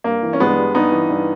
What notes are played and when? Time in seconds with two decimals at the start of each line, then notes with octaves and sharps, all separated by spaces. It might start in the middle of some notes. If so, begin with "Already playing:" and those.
0.04 G2 A#3
0.23 E3
0.33 C#4
0.40 G2 G#3 B3
0.57 G3
0.74 G2 B3 D#4
0.92 E3
1.10 G2